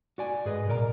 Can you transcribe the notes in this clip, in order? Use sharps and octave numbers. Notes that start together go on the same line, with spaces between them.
F#4 D5 G#5
G#2 G#4 B4 D#5
C2 A#2 A#4 D5 A#5